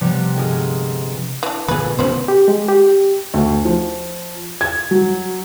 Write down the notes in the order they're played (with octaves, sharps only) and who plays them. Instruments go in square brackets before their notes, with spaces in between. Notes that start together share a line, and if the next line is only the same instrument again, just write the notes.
[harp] C3 F3 G3 B3
G1 G#3 F4 G#4 D#6
[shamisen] E3 D4
[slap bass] A#2 D3 [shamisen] G#4 B4
[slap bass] B2 D#3 A3 [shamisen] C#4 B4 C5
[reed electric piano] G4
G#3
G4
[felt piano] D2
F3
G#6
F#3